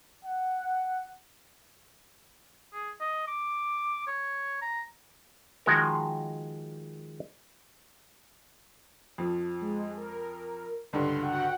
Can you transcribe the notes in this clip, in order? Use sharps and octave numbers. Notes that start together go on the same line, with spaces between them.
F#5
G#4
D#5
D6
C#5
A#5
D#3 F3 G#3 F#4 A#4
F2 F3
G#3
A#4
C#2 G2 D3 C6
F#4 F#5 G5